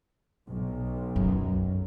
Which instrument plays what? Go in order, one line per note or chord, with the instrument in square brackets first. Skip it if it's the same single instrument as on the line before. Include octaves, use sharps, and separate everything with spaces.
[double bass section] B1
[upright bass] F#2